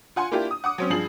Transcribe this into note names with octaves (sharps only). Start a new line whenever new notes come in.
F4 F#5 G#5 C6
A#3 D4 E4 F4 G4
D#6
F#5 D6 D#6
F#3 C4 C#4
G2 F3 G#4 C7 F#7